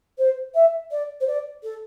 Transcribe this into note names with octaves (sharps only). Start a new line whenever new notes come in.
C5
E5
D5
C5
D5
A4